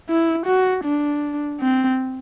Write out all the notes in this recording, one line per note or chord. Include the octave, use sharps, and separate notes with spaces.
E4
F#4
D4
C4